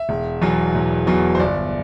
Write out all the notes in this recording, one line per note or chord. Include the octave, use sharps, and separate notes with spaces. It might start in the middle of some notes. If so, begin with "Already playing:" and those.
Already playing: E5
E1
E2 B2 F#3
E1
E2 B2 F#3
C5
G1 D5